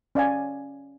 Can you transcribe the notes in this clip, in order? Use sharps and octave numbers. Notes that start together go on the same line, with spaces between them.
C#4 D5 F5 G#5